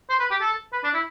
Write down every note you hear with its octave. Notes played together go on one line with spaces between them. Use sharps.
C5
B4
G4
A4
B4
D4
E4